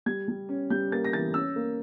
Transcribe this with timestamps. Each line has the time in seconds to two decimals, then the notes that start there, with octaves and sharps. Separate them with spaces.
0.06 G3 G#6
0.28 G3
0.49 C#4
0.70 G3 G6
0.92 A#3 A6
1.05 A#6
1.13 E3 A6
1.34 C#4 E6
1.56 A#3